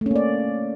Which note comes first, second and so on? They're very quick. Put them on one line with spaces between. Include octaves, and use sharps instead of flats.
A3 C#4 A#3 D5